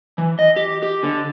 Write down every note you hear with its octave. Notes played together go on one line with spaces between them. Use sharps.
E3
D#5
G4
G4
D3